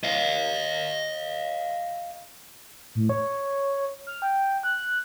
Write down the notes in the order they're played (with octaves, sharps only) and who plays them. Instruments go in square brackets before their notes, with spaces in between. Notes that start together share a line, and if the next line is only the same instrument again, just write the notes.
[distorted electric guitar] D#5 F5
[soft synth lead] A2
C#5
F6
G5
F#6